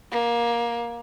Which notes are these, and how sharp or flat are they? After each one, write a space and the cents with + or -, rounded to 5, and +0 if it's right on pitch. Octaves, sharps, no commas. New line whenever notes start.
A#3 +20